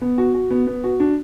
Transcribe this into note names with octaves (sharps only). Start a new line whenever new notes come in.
B3
F#4
F#4
B3
B3
F#4
D4